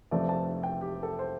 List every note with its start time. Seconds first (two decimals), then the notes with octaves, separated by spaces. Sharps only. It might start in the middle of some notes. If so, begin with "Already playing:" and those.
0.11 F1 F2 F3 A3 C4 D5
0.29 A5
0.63 G5
0.81 G4
1.03 A4
1.19 C5